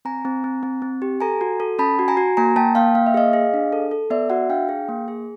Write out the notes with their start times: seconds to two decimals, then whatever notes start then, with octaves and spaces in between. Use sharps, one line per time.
0.05 C4 G#5 A#5
0.25 C4
0.44 C4
0.63 C4
0.82 C4
1.02 G4
1.20 A4 G#5 A#5
1.41 F#4
1.60 A4
1.79 C#4 A5 B5
1.99 F#4
2.08 G#5 A#5
2.17 F#4
2.37 A#3 G#5 A#5
2.56 A#3 G5 A5
2.75 A#3 F5 G5
2.95 A#3 F5
3.06 E5
3.14 G#4 D#5 F5
3.33 G#4
3.54 D4
3.72 A4
3.91 A4
4.10 B3 D5 E5
4.30 F#4 E5 F#5
4.49 D4 F5 G5
4.69 G#4
4.89 A#3
5.08 G#4